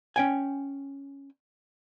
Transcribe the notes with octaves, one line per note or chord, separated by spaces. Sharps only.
C#4 G5 G#5